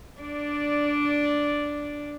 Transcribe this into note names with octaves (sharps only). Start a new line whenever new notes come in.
D4 D5